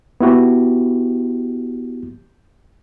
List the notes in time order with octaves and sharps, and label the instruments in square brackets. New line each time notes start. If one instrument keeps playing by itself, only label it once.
[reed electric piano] B3 E4 F#4 G4